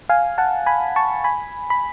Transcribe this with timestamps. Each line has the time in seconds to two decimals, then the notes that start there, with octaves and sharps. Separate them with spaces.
0.09 F5 G#5
0.38 F#5 A5
0.66 G#5 B5
0.96 A5 C#6
1.24 G#5 B5
1.70 B5